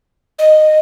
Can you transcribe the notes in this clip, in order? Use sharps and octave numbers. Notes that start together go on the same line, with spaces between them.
D#5